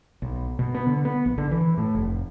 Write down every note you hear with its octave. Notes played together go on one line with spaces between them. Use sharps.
B1
B2
B3
D3
B3
A#1
D3
E3
A2
F1